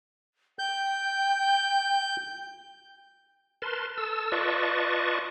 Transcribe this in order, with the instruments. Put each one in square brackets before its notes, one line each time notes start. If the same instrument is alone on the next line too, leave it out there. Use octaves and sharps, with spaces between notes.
[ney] G5 [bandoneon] G6
[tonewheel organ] A#4 B4 A5 C6
A4 A5 E6
F4 B4 D5 D#5 A5 C#6